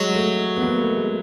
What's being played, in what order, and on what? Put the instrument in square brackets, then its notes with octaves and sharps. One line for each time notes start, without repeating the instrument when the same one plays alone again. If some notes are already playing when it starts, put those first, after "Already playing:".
Already playing: [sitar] F#3 [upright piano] G#3
[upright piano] A3
B3
A#3
A3
G#3